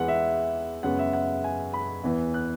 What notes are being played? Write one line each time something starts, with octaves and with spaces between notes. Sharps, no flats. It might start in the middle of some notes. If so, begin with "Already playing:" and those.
Already playing: E2 E3 G#3 B3 F#5
E5
F#2 C#3 G#3 B3 F#5
E5
F#5
G#5
B5
E2 E3 B3
F#6